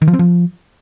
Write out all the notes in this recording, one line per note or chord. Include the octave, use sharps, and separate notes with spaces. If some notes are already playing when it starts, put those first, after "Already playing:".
D#3
F3
C4
F3